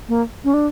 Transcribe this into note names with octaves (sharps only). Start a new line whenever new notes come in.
A#3
C#4
D4